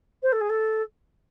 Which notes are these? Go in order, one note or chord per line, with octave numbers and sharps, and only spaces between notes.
C5
A4
G#4
A4